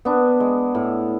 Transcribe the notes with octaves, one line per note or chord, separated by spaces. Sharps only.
B3 D4
G#3
A2